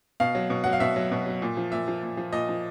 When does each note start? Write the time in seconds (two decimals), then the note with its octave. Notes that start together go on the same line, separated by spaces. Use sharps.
0.20 B2 F5
0.35 F#3
0.50 B2
0.64 F#3 F#5
0.73 F5
0.80 B2 E5
0.96 F#3
1.11 B2
1.26 F#3
1.42 A#2
1.57 F3
1.72 A#2 E5
1.88 F3
2.03 A#2
2.17 F3
2.33 A#2 D#5
2.49 F3